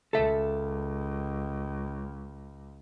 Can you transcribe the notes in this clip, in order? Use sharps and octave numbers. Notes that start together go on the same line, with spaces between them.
C#2 A4 E5